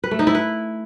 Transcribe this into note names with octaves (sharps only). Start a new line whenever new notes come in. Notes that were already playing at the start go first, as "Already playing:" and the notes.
B4
A3
D#4
E4
B4